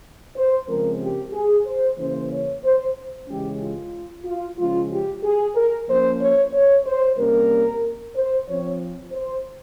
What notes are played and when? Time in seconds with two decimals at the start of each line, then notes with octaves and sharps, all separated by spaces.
0.36 C5
0.69 C#3 F3 G#3 C4 A#4
1.02 G4
1.34 G#4
1.66 C5
1.98 C#3 E3 A#3 C#4 C5
2.31 C#5
2.64 C5
3.28 C#3 E3 G#3 C#4 G4
3.61 F4
4.25 F4
4.58 C#3 F3 G#3 C#4 F4
4.90 G4
5.24 G#4
5.56 A#4
5.88 F3 A#3 C#4 C5
6.20 C#5
6.53 C#5
6.85 C5
7.17 C3 G3 A#3 C#4 A#4
8.15 C5
8.47 F3 C4 C#5
9.12 C5